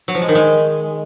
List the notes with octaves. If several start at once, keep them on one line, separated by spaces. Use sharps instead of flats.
F#3
F3
G#3
D#3
G#3